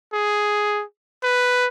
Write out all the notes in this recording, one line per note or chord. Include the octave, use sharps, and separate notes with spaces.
G#4
B4